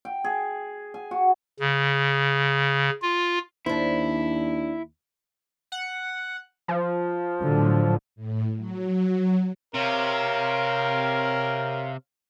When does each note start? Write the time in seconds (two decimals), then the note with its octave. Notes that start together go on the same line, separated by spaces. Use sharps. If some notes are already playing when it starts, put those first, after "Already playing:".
0.05 G5
0.24 G#4
0.94 G#5
1.11 F#4
1.60 C#3
3.02 F4
3.66 D#2 D4 E4 C5
5.72 F#5
6.68 F3
7.42 A2 D3 F#3
8.16 A2
8.57 F#3
9.74 C3 A#4 C#5 F5